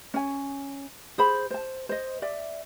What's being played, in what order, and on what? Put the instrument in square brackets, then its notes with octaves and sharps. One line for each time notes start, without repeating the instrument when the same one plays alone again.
[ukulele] C#4 G#5
G#4 C5 B5
C5 A5
C5 D#5
D5 E5